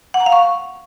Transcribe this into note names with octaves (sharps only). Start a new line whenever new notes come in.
F#5
A#5
F5
C#6